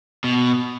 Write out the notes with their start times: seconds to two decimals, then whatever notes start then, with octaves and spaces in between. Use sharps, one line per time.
0.24 B2